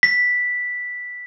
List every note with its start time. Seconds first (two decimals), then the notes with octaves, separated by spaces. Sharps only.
0.03 B6